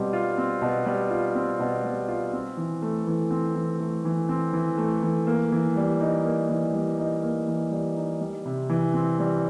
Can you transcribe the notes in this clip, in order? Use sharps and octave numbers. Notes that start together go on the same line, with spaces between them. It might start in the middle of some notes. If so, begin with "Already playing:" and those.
Already playing: B2 G3 C4
F4
C4
B2
G3
F4
C4
B2
G3
F4
C4
E3
A3
E3
C4
E3
A3
E3
C4
E3
A3
E3
A#3
E3
G3
D#4
A#3
E3
G3
D#4
A#3
E3
G3
D#4
G3
C3
E3
C4
G3